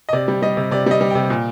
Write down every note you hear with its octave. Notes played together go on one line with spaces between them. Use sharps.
D#5
C3 D5
G3
G3 D#5
C3
C3 D5
G3 D#5
G3
C3 G5
A#2